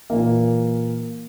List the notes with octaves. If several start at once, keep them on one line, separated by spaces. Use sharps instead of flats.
A#2 E3 A#3